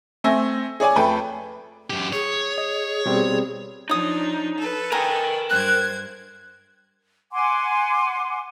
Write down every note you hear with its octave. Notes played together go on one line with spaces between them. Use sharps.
A3 C4 G#5 E6 A#6
G#4 C#5 D5 G#5
F2 A3 A4 B4 G5
F#2 G4
G#4 C#5
D#5
B2 G3 C4
F3 D4 D#4 C#5 D#6
A4 B4
A#4 G5 G#5 A#5
G2 C5 F#6 G#6
F#5 G#5 C6 D6